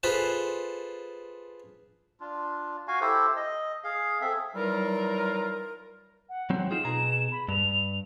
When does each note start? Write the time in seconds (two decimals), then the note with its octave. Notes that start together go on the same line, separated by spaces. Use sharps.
0.03 F4 G#4 A4 B4 C5
2.20 D4 F4
2.88 F#4 F5 G#5
3.01 E4 G4 A4 C5
3.36 D#5
3.84 G#4 F5
4.21 C4 G#4 A4 E5
4.55 E3 F#3 G3 D#4 F4 A#4
6.29 F#5
6.50 F#3 C4
6.71 D#4 F4 G#4 E7
6.85 B2 G#4 A#5
7.32 B5
7.49 G2 F7